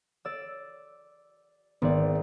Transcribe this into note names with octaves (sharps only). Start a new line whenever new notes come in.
D5 E6
G#1 B3 D5